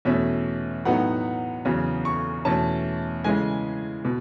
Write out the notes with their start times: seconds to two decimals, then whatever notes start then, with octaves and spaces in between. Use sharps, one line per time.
0.05 E2 B2 A3 C#4 E5
0.85 A2 F#3 B3 D#4 F#5
1.65 E2 C#3 F#3
2.05 C#6
2.45 E2 B2 A3 C#4 A5
3.24 C#3 E3 G#3 G#5
4.05 B2